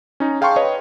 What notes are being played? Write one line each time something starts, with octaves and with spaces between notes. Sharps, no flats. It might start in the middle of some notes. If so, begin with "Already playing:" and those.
C#4 D#4
G#4 F5 G5 A5 C6 C#6
B4 C#5 D#5